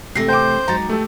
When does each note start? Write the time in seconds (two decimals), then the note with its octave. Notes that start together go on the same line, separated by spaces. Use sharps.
0.15 C3 E3 A3 A#6 C7
0.28 C5 G5 D6 G6
0.68 F#3 G#3 D#4 A#5 A6
0.89 A3 G4 A4